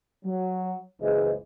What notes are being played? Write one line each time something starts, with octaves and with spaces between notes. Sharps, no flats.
F#3
F#1 C#2 E3 G#3 C5 D#5